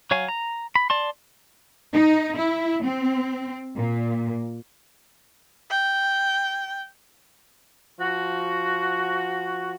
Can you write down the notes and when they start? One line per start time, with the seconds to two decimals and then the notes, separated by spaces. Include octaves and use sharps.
0.11 F#3 C#5 F5 G#5
0.28 A#5
0.76 B5
0.90 D5 A5 C6
1.94 D#4
2.37 E4
2.85 C4
3.77 A#2
5.70 G5
8.00 F3 F#4